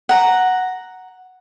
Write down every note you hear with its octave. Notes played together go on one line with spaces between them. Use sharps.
F#5 A#5